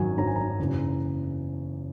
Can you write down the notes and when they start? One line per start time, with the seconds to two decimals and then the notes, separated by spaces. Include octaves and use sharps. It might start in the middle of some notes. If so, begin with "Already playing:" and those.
Already playing: G#1 F#2 D#3 F#3 G#5
0.18 G#1 F#2 D#3 F#3 A#5
0.27 G#5
0.36 A#5
0.58 F#1 E2 C#3 E3